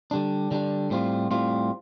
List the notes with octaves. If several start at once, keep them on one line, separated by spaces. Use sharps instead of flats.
D3 G3 D4
D3 G3 D4
A2 G3 C4 F4
A2 G3 C4 F4